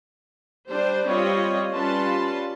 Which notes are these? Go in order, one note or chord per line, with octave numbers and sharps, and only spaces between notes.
G3 D4 C5
G3 C4 F4 B4 C#5 D#5
G3 C#4 F4 B4 A5 C6